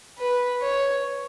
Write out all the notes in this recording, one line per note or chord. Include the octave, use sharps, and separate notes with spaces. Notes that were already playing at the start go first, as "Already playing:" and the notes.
B4
C#5